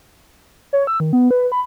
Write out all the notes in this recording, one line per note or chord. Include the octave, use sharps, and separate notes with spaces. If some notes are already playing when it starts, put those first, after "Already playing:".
C#5
E6
D#3
B3
B4
B5